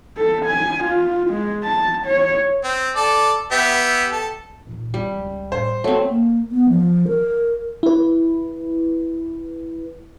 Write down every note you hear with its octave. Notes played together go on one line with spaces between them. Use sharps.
A4
G#5
F4
G#3
A5
C#5
C4
A4 D5
B3 G4 E5
A4
A#2 D#3
G3 C4
C#2 C#3
A2 C5
C2 F#3 A3 C4
A#3
B3
F3
A#4
E4 B4